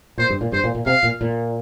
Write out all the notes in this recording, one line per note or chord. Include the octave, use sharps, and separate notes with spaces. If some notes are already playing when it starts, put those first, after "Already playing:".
A#2 C5
G2
A#2
G2 C5
A#2
A#2
C3 F5
A#2
A#2